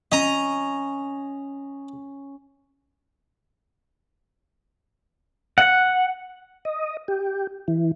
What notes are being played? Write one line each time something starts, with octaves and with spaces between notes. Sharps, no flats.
C#4 D#5 A#5
F#5
D#5
G4
E3